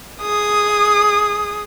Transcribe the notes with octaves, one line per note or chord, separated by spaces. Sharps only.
G#4 D#6